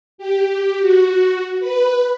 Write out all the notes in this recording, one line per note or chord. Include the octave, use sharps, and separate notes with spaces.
G4
F#4
B4